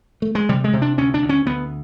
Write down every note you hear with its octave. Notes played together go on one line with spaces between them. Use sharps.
A3
G#3
C3 G3
G#3
C3
D4
D2 C#4
D4
D2
C#4
D2 B3